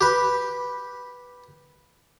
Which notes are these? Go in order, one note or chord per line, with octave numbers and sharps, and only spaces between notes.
G4 B4